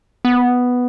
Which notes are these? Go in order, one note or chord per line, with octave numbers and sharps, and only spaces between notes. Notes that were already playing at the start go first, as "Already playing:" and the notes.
B3